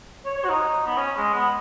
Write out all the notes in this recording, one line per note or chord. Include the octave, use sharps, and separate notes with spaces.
C#5
C#5
F#4
D#4
B3
C#4
G#3
B3